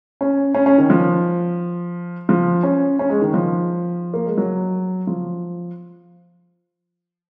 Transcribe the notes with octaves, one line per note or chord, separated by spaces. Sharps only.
C#4
C#4
C#4
D#3
F3
F3
C#4
C#4
G#3
D#3
F3
A#3
G#3
F#3
F3